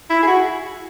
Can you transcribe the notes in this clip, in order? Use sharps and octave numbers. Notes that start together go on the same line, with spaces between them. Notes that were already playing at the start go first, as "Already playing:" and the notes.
E4
G#4
F#4